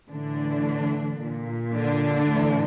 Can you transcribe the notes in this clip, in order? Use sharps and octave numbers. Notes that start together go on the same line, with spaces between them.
A2 D3 E3 D4
A#2
D3 D4
A2 E3